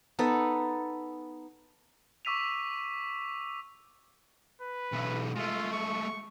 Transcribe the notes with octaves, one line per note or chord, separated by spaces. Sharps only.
B3 D#4 A4 B4
C#6 D6 E6 B6 D#7 F7
B4
B1 E3
G#3 A3 F4
C#6